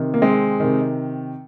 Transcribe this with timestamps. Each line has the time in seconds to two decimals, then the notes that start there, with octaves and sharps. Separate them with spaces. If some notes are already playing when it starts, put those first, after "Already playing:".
Already playing: C3 D#3
0.14 A#3
0.22 G#3 C4
0.60 C3 D#3